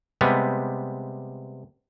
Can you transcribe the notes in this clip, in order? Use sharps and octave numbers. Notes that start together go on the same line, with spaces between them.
C3 G3 G#3 B3